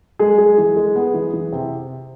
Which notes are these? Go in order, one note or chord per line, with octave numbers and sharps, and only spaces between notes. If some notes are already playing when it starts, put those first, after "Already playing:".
G#3 G#4
G#3
E3
G#3
B3
E3
E3
C3